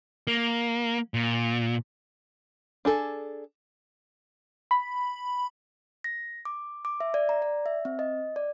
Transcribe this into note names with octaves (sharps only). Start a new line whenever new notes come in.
A#3
A#2
D4 G#4 A4
B5
A#6
D6
D6
E5
D5
A#5
D5
E5
C4
D#5
D5